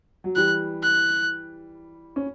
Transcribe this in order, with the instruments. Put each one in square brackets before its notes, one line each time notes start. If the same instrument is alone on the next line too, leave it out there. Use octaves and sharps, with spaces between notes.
[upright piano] F#3
[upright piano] E3 G3 [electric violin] F#6
[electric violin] F#6
[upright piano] C#4